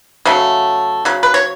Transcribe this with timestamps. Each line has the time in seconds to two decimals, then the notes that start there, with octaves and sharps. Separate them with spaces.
0.25 C#3 F#3 A3
1.05 C#3 F#3
1.23 B4
1.34 C#5